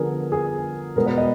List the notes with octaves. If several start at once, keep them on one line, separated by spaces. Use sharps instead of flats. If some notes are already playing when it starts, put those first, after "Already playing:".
Already playing: D3 F3 B3 G#4 A#4
G#4
B2 G#3 B3 A#4
B4
D#5